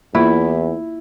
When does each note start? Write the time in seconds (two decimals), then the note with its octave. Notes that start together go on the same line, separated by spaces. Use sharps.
0.15 E2 A#3 E4 F4